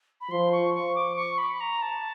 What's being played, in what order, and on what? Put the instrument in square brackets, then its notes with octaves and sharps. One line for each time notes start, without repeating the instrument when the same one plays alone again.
[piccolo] B5
[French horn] F3 [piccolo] C6
[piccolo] C#6
C#6
D6
C#6
B5
A#5
A5